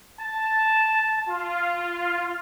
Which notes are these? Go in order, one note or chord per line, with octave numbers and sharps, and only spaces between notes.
A5
F4